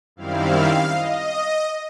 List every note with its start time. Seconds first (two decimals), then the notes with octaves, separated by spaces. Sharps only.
0.16 F#2 D#3 G3 C4 E4 F5
0.88 D#5